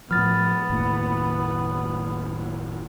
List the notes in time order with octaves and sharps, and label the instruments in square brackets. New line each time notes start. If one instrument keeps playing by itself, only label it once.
[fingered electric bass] A2 F3 [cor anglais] B3 [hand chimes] F6 A6
[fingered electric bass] F#1 D#2 A2